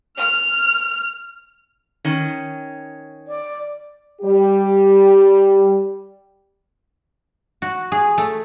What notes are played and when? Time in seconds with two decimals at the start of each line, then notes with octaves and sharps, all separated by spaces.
0.19 F6
2.05 D#3 C#4
3.28 D5
4.22 G3 G4
7.62 F#4
7.92 G#4
8.18 A3